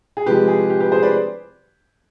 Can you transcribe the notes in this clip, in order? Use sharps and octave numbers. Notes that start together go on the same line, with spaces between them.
G#4
C3 F3 G#3 G4 B4
G#4
G4
G4 B4
G#4 C5
B4 D5